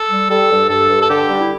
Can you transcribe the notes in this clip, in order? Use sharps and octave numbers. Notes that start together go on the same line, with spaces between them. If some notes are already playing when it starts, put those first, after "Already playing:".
Already playing: A4
G3
G3 A4
G2
G2 A4
G2
A4
D3 G4
G3 D4
E4